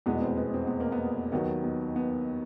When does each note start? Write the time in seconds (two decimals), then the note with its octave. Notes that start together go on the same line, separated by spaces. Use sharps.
0.06 F1 E2 B2 G#3 B3
0.22 C4
0.37 B3
0.54 C4
0.67 B3
0.80 A#3
0.92 B3
1.32 D#2 D#3 F#3 B3
1.64 B3
1.96 B3